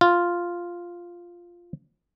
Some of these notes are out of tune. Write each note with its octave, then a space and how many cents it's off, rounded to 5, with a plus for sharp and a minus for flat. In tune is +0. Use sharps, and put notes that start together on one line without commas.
F4 +0